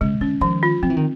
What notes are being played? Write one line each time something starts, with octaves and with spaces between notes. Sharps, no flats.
C#3 G#3
D3 C#4
D#3 F3
F4
F3 C4
E3
D#3